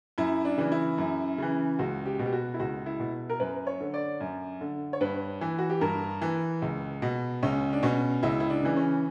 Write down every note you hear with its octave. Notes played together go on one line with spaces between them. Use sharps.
F#2 E4
D4
C#3 E3
E4
F#2
C#3 E3
C#2 F#4
G4
B2
G4
F#4
E4
C#2 F#4
E4
B2
A#4
F#2 B4
C#5
D3
D5
F#2
D3
C#5
G2 B4
E3
F#4
G4
G2 A#4
E3
C#2
B2
C#2 C#4
D4
B2 C#4
C#2 E4
E4
D4
C#3 E3
C#4